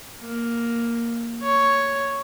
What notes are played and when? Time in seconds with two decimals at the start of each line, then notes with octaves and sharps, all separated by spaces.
0.21 A#3
1.42 C#5